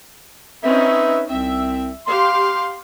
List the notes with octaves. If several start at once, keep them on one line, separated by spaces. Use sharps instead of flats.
C4 C#4 D#4 B4 E5
C2 C4 E5
G4 F5 C6